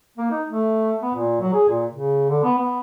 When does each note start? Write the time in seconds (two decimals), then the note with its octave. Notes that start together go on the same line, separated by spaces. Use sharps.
0.18 A#3
0.31 D#4
0.48 A3
1.02 B3
1.14 A#2
1.41 F#3
1.53 G#4
1.69 A#2
1.93 C#3
2.30 D3
2.43 B3
2.58 B3